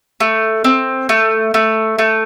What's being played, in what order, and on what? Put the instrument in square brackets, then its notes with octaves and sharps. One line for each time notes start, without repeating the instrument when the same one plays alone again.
[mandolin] A3
C4
A3
A3
A3